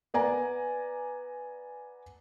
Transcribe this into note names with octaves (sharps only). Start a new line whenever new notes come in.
B3 D5 G#5 A#5